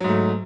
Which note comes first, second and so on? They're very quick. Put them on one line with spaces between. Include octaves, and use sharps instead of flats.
F#3 G#2 A3